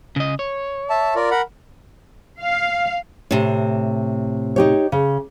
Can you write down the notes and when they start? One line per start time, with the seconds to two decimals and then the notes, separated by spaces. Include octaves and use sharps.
0.16 C#3 D#5
0.39 C#5
0.90 E5 A5
1.15 F4 A#4 D5
1.31 A#4 F#5 B5
2.41 F5
3.31 A2 C3
4.56 D#4 G4 C#5
4.92 C#3